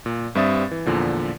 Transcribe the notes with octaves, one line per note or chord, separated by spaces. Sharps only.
A#2
G2 G3 C4 E5 D#6 A6
E3
E2 A#2 D3 F3